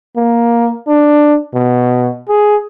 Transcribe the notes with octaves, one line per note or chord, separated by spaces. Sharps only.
A#3
D4
B2
G#4